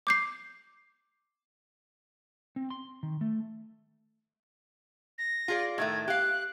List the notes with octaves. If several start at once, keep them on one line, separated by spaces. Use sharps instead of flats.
D6 G6 C7
C4
C6
D#3
A3
A#6
F4 G#4 D5
A2 D#3 A3 G#6
G4 F5 F#6